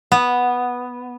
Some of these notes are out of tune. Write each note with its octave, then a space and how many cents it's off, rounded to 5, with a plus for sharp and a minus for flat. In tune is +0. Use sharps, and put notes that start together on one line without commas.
B3 -5